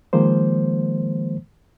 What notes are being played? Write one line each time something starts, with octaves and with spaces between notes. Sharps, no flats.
D#3 F3 G#3 A#3 C5